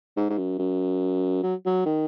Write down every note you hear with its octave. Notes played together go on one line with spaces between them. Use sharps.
G#2
G#2
F#2
F#2
F#3
F#3
D#3